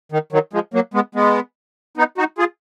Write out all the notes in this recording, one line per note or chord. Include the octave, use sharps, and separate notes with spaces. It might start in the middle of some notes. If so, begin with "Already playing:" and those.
D#3
D#3 F#3
F3 G#3
F#3 A#3
G#3 B3
G#3 B3
B3 D#4
D#4 F#4
F4 G#4